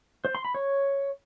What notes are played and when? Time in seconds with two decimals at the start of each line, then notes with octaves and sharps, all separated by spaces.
0.25 C5
0.35 C6
0.45 B5
0.55 C#5